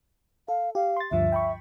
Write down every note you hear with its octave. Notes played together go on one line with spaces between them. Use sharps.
A4 F5
G4 F5
C6 A6
D2 G2 F3 E5
G5 B5 C#6